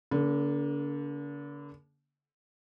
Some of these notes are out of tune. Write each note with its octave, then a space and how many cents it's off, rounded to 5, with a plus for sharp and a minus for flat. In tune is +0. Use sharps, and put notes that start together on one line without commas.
D3 -40 A#3 +25